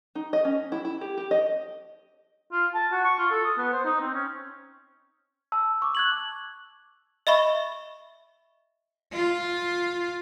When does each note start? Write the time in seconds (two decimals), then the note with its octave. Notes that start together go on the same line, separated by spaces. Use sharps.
0.15 D#4
0.33 D#5
0.45 C#4
0.72 E4
0.85 E4
1.01 G4
1.17 G4
1.31 D#5
2.52 F4
2.74 A5
2.92 F#4
3.05 C#6
3.19 F4
3.30 A4
3.44 D#6
3.58 B3
3.73 C5
3.85 D#4
4.01 C4
4.14 C#4
5.52 A5 E6
5.82 C#6 D6
5.95 F#6 G#6 F#7
7.27 D#5 E5 B5 C#6
9.13 F4